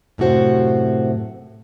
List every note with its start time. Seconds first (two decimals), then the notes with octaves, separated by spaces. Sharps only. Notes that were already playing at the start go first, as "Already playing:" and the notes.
0.18 F#2 A2 C3 F#4 C5